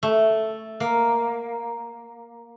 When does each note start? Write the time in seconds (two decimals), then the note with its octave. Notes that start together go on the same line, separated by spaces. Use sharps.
0.03 A3
0.80 A#3